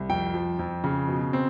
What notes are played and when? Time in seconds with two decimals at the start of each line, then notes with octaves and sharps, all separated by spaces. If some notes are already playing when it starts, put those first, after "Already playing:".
Already playing: C2
0.09 F2 G5
0.34 F3
0.59 F2
0.84 C#3
1.08 B2
1.33 C4